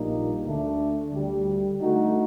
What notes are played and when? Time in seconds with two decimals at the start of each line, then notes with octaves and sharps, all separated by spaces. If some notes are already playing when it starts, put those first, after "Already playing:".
Already playing: A#1 A#2 G3 A#3 D#4
0.45 D2 D3 A3 D4
1.12 D2 D3 G3
1.80 D3 A3 D#4 F#4